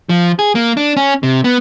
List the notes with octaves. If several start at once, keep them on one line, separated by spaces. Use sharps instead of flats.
F3
G#4
A#3
D4
C#4
C3
B3